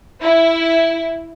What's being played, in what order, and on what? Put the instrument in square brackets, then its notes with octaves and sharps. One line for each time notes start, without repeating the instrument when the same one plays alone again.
[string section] E4